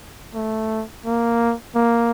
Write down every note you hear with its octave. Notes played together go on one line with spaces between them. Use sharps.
A3
A#3
A#3